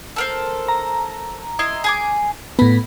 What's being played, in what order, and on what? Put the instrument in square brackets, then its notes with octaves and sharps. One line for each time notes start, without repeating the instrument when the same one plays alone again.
[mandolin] A4 A#4 C5
[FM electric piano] A#5
[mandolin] E4 D#5 C6
G#4 G#5 D6
[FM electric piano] A2 B3 [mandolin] B5